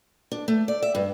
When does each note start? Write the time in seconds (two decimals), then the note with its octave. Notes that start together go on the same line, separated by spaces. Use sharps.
0.32 D4
0.48 A3
0.68 D5
0.82 E5
0.95 G2